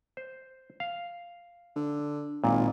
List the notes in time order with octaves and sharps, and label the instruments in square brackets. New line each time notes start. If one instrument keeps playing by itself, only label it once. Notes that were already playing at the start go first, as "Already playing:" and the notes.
[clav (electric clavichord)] C5
F5
[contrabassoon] D3
[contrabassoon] G#1 [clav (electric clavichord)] A#2